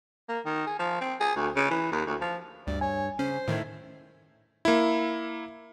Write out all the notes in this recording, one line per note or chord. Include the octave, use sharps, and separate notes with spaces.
A#3
D#3
G#4
F3
C4
G#4
D2
C#3
E3
D#2
D2
F3
D2 G2 D5
C#5 G#5
C#3 C#4 C5
A2 D#3 A3 D#4 E4
A#3 E4